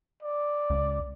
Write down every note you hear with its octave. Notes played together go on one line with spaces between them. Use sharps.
D5
C#2